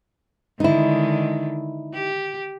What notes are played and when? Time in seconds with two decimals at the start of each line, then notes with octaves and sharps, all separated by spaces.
0.60 D3 D#3 G#3 D#4 E4
1.94 G4